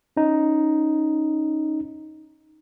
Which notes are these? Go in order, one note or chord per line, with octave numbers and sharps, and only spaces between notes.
C#4 D#4